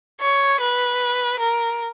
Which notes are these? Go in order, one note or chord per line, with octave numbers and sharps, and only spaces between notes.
C#5
B4
A#4